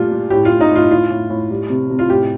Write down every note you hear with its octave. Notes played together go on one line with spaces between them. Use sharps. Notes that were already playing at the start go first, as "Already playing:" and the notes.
Already playing: A#2 G3 A3 F4
G3
A2 G4
F4
A2
D#4
A2 F4
A2 F4
A2
A2
G3
C3
C3
F4
A2 G4